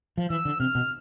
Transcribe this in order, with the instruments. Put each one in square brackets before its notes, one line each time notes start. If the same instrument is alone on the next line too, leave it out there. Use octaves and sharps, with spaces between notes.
[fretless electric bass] F3
[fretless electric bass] E3 [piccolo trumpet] E6
[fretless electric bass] D3
[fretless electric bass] C3 [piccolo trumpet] F6
[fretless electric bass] B2